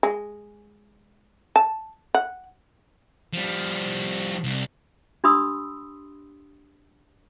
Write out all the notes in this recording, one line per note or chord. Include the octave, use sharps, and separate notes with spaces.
G#3
A5
F#5
F3 G3
C2
D4 G4 B5 C6 D#6 E6